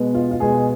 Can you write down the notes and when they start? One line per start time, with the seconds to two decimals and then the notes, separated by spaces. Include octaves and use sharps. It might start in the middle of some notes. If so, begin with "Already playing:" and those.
Already playing: B2 G#3 B3
0.15 F4
0.31 F4
0.40 B2 G#3 B3 G#4